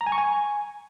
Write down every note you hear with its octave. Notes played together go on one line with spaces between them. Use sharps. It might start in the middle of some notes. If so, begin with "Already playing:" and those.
A#5
G#5
C#6
G#5